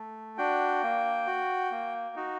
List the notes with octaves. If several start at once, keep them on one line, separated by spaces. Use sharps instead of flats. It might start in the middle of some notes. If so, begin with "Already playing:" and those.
Already playing: A3
D4 F#4 G5
A#3
F#4
A#3
D#4 F#4